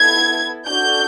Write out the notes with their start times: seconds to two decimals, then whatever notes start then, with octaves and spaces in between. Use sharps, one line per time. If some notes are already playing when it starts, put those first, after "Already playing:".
Already playing: B3 E4 A4 G#6
0.67 D4 F#4 A4 G6